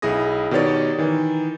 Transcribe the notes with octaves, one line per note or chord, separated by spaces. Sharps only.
B1 E4 G#4 D#6 A#6
B2 D#3 G4 C#5 D5 A6
D#3 E3